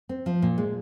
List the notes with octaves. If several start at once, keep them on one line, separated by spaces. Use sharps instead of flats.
C4
F3
A#2
G#3